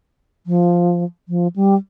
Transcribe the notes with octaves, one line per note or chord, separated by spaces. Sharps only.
F3
F3
G3